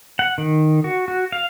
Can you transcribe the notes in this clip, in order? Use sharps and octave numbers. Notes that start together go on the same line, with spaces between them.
F#5
D#3
F#4
F#4
F5